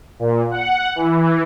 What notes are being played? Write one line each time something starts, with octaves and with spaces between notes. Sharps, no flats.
A#2
F#5
E3